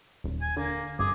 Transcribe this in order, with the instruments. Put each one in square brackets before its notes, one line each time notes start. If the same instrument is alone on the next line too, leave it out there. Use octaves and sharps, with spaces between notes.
[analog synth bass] D#1
[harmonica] G#5
[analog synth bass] D3 [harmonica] A#3
[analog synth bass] G1 [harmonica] G#4 G#5 D6